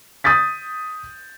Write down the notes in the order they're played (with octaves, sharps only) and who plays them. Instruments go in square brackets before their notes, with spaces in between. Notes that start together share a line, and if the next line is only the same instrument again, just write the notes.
[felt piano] D#6 G6 A6 B6